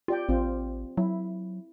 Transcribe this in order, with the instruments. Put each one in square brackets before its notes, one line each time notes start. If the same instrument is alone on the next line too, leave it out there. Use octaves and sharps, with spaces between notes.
[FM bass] F4 [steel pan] G4 D5 G5
[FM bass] A1 [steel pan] C4 F4
[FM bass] F#3 [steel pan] E4